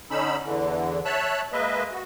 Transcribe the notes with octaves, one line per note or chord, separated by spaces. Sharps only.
D3 C#4 D#4 B5 E6
E2 D3 E3
C#5 E5 A5 E6 F#6
G#3 A#3 B4 D#5 E5
F#4